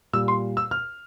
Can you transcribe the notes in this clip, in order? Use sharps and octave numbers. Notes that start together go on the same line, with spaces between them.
A#2 G3 E6
C6
E6
F6